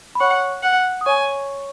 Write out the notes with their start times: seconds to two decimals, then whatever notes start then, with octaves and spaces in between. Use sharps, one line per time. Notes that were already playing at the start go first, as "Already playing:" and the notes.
0.15 B5
0.20 C#5 F#5 C#6
0.63 F#5
1.01 D#6
1.06 C#5 G#5 C#6